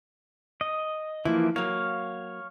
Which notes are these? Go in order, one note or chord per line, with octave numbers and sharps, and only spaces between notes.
D#5
E3 F3 A#3 E4
F#3 A#3 C#5 F5